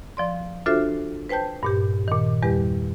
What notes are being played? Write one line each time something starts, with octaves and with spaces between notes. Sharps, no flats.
F3 D5 C6
D4 F4 F#4 A4 C5 E5
B4 C5 G5 A5 G6
G2 A#2 G4
A#2 D#3
E2 G3 G4 B4